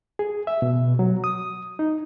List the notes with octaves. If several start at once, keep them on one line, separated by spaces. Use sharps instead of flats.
G#4
E5
B2
F#3
D#6
D#4